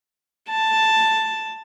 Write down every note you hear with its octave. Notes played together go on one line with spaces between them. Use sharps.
A5